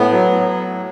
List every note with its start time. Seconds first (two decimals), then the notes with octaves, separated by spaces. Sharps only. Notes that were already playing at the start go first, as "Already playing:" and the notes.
Already playing: A2 B3
0.12 F#3
0.30 A2
0.49 F#3
0.67 A2